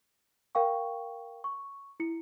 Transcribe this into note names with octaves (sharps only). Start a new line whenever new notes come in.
A#4 F5 G5 C#6
C#6
E4 C#7